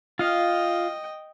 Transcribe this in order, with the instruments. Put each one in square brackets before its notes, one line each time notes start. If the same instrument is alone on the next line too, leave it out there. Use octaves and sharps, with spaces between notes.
[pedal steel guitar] F4 F5 [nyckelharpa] D#5 G5